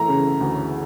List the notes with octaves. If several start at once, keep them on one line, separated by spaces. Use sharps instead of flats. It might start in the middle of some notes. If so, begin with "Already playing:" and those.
Already playing: E3 A3 A#5
C#3
D2